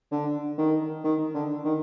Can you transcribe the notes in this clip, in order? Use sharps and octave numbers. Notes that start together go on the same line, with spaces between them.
D3
D#3
D#3
D3
D#3